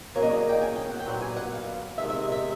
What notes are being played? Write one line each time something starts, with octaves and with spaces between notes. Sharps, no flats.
E2 C#3 F#3 A#3 C#4 C#5
D#5
D5
G5
G#5
G5
F#5
G5
A#2 F#3 B3 F#5
G#5
F#5
F5
C3 D#3 G#3 E5
E5
D#5
E5